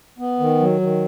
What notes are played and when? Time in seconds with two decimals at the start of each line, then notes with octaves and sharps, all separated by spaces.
0.18 B3
0.40 D#3
0.60 F#3
0.81 D#3